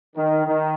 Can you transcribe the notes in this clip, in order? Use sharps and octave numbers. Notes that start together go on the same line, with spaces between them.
D#3
D#3